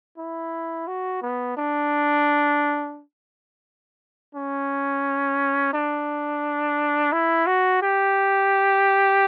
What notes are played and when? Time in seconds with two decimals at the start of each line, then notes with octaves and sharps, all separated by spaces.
0.18 E4
0.87 F#4
1.22 B3
1.57 D4
4.35 C#4
5.73 D4
7.12 E4
7.46 F#4
7.82 G4